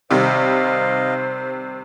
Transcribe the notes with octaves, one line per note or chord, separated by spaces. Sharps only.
C3 D#3 G3 C5 D#5 F5